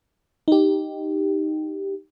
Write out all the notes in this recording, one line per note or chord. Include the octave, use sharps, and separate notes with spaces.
D#4 G4